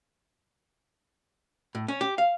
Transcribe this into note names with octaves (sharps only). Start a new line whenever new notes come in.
A2
C#4
G4
F5